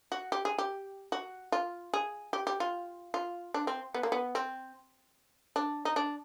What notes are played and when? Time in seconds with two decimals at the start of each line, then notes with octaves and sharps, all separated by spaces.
0.12 F#4
0.32 G4
0.45 G#4
0.58 G4
1.12 F#4
1.52 F4
1.94 G#4
2.33 G4
2.47 G4
2.60 F4
3.14 F4
3.54 D4
3.67 C4
3.94 B3
4.03 A#3
4.12 B3
4.35 C4
5.56 D4
5.85 D#4
5.96 D4